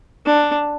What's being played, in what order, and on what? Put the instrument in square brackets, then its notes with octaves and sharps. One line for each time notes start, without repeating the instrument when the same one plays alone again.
[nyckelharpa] D4